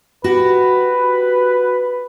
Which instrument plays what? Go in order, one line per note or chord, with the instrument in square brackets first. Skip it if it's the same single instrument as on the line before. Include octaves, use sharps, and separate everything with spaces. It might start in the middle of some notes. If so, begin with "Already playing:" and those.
[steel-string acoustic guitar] F#4 G4 [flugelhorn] B4